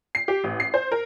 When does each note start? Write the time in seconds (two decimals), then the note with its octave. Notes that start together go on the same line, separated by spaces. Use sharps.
0.15 C7
0.28 G4
0.44 A1
0.60 C7
0.74 C5
0.92 A#4